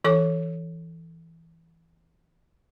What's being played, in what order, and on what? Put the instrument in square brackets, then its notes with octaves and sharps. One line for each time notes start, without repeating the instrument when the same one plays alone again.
[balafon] E3 A4 C#5 D6